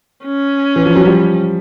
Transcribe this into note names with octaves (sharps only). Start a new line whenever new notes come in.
C#4
E3
F3
F#3
F3 G3